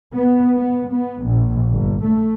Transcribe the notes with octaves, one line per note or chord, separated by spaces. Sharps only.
B3
B3
B3
A#1
G1
A3